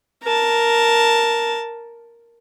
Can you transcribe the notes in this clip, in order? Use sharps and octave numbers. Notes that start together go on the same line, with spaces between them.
A#4 A5